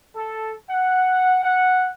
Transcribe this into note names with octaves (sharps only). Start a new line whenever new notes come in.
A4
F#5
F#5